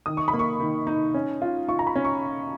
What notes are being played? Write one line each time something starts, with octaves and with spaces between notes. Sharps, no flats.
D#3 D#6
C#6
B5
A#3
C#6
D#3
D#4
C#4
F4
F4 C#6
A#5
B5
C#4
C#6